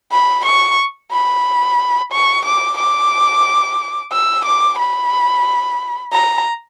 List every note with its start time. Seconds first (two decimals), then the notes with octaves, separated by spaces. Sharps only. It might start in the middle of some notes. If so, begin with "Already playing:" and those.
0.12 B5
0.46 C#6
1.12 B5
2.13 C#6
2.46 D6
2.78 D6
4.12 E6
4.45 D6
4.79 B5
6.13 A#5